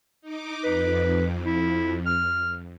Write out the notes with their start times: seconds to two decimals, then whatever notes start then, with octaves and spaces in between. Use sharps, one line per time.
0.22 D#4 D6
0.63 F2 B4
1.45 E4
2.06 F6